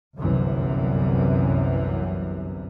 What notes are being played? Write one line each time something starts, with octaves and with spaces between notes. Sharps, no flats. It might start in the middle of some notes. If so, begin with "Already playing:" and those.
G1 C2 F#2 C3 E3